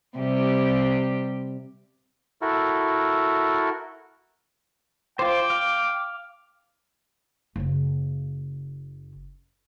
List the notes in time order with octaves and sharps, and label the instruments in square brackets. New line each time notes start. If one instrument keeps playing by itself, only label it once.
[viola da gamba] C3 G3 G4
[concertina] E4 F#4 A4 A#4
[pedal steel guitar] F4 C5 [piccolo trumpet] G5 [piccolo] D6
[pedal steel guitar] F5
[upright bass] F#1 C#3